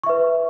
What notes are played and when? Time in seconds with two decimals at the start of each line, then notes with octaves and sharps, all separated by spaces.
0.04 C#6
0.06 E5
0.09 B4